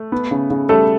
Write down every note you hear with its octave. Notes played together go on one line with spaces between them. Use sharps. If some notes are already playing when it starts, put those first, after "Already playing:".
Already playing: A3
B3
C#3
C#3
G3 A3 A4